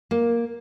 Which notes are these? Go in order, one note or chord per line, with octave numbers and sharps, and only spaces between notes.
A#3